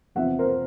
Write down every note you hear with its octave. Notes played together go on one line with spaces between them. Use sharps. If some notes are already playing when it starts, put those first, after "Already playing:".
E2 C3 F3 E5 F#5
A#4 C5